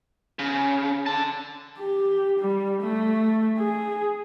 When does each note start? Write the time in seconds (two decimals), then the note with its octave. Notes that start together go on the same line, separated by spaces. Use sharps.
0.39 C#3
1.06 D3 A5
1.79 G4
2.40 G3
2.82 A3
3.59 G#4